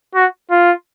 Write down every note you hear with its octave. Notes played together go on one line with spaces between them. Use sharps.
F#4
F4